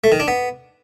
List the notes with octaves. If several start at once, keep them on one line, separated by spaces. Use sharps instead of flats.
A3
D#3
D4
B3